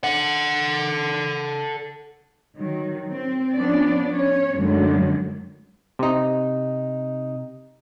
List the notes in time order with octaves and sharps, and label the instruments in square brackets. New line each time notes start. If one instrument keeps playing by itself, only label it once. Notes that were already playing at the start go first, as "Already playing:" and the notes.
[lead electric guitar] A4 F#5
[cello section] D#3 F#3
C4
F3 B3 C#4 D4 D5
C#4 C#5
F#2 D3 D#3 F#3 G#3 A3
[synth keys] C3 D#4